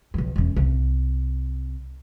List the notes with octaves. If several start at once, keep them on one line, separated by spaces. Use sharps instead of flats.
B1 F3
E1 C#4
C2